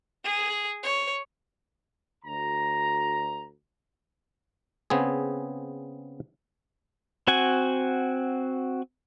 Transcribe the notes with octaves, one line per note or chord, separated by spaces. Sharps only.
G#4
C#5
D2 A#5
C#3 B3 C4 G#4
C4 F#4 F#5 G#5